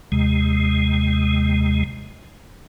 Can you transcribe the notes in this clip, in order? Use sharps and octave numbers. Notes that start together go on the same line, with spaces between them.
D#2 C3 G#3